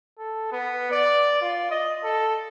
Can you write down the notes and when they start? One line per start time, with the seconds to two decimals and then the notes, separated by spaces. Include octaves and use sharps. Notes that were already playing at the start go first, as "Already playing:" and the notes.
0.19 A4
0.52 B3
0.92 D5
1.41 F4
1.71 D#5
2.04 A4